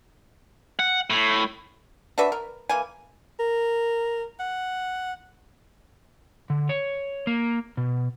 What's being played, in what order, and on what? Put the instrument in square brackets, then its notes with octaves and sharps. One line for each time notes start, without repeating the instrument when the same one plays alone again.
[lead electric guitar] F#5
A2
[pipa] D4 F#4 B4 E5
A#4
E3 A#3 G#5
[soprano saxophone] A#4
F#5
[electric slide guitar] D3
C#5
A#3
B2